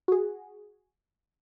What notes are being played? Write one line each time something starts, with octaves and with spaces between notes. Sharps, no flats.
F#4 G#4